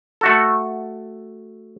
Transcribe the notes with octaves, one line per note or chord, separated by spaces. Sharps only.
A3 F#4 A4